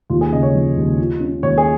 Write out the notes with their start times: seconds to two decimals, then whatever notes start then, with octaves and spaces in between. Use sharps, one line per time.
0.10 D#2 F4
0.21 G#4
0.32 C#3 D#5
0.43 C#5
0.54 F3
0.77 D#2
0.99 F4
1.20 C#4
1.43 D#2 C#5
1.58 G#4